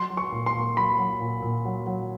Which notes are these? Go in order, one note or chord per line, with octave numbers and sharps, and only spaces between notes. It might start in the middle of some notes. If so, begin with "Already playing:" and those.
Already playing: F#3 C6
F#3
C#6
A#2
C6
A#2
F#3 B5
F#3
A#2
A#2
F#3
F#3